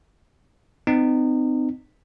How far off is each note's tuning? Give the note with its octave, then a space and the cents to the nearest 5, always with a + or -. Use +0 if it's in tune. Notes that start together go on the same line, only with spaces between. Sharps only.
C4 -35 D#4 -30